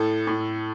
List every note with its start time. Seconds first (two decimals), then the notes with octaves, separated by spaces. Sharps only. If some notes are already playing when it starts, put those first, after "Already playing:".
Already playing: A2 A4
0.27 A2